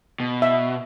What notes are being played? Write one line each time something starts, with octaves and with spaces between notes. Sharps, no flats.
B2
E5